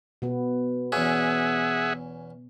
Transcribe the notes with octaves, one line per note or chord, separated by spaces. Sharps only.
B2 B3
E2 C#4 G#4 E5 F#5